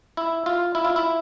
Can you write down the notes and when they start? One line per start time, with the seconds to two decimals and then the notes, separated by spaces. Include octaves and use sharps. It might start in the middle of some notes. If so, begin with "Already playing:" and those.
0.17 E4
0.46 F4
0.75 E4
0.85 F4
0.96 E4